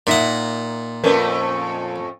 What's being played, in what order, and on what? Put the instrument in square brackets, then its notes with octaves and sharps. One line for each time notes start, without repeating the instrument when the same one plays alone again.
[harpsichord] A#2 F#5 [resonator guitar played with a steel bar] A#3 D#4 E5
[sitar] F2 A3 C#4 [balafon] A#4 B4 D5